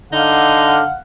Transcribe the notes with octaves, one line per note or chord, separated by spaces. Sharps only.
D3 D#4 F5 F#5